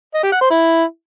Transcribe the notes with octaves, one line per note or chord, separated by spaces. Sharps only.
D#5
G4
F#5
C5
E4